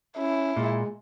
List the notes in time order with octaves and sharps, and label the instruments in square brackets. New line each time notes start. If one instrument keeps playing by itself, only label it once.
[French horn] C#4 [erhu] E4
[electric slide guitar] A#2 [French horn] G#3